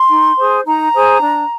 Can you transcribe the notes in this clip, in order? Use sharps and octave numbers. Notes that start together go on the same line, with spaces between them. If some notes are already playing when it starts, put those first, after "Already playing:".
Already playing: C6
D#4
G#4 C5
D#4 A#5
G#4 C5
D4